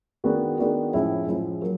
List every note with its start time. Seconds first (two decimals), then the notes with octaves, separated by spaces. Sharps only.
0.24 D#3 G#3 B3 D4 F#4
0.58 D#3 G#3 B3 D4 F#4
0.93 A2 F3 G#3 C#4 E4
1.26 A2 F3 G#3 C#4 E4
1.61 F#3 A#3